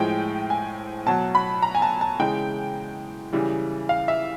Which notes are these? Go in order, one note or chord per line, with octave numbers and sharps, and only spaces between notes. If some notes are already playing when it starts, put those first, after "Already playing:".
Already playing: A2 F3 G#3 G5
G#5
B2 F#3 A5
B5
A#5
G#5
A5
A5
C#3 E3 G#3 G5
C#3 E3 G3
F5
E5